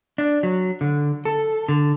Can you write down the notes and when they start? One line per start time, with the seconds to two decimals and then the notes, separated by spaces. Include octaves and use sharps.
0.18 D4
0.43 F#3
0.81 D3
1.25 A4
1.69 D3